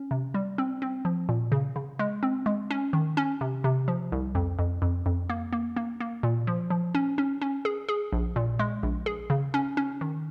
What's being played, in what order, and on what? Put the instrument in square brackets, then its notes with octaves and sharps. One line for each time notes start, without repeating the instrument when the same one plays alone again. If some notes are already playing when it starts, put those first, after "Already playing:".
Already playing: [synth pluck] C#4
C3
G3
C4
C4
F3
A#2
C#3
C#3
G#3
C4
G#3
C#4
D#3
C#4
C3
C3
F3
C2
F2
F2
F2
F2
A#3
A#3
A#3
A#3
A#2
F3
F3
C#4
C#4
C#4
G#4
G#4
A#1
A#2
G#3
A#1
G#4
C#3
C#4
C#4
D#3